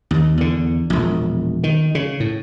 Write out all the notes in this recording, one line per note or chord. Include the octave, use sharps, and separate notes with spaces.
D#2
E2 D3
E1 A#1
D#3
C#3
A2